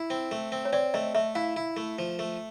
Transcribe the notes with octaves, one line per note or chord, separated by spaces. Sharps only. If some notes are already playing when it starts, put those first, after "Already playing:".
Already playing: E4
C4
A3
C4
C#5
C4 D5
A3 D#5
A3 E5
E4 F5
E4
A3
F3
A3